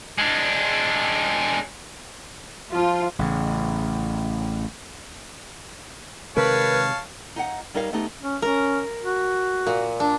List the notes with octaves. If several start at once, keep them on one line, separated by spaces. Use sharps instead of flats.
G#3 D4
F3 F4
A1 C#3
C3 D#3 G#3 A#4 B4 C#5 F5 A5
D#4 F5 F#5
G3 D#4 A#4 C#5 F5
A3 B3 D#4 G4
C#4
C#4 A#4
F#4
A#2
D4